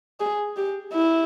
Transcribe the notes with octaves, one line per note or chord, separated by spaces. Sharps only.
G#4
G4
E4